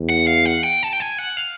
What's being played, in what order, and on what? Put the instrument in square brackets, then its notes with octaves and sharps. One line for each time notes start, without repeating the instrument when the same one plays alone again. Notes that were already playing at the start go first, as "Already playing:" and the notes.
Already playing: [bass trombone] E2
[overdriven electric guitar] F#5
F5
F#5
G5
A5
G5
G#5
F#5
F5